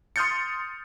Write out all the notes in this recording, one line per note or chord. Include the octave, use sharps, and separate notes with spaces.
C6 D#6 F6 G6 A6 C#7